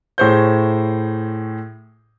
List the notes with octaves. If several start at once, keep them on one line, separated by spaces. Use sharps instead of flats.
A2 G#4 C5 C#5 G6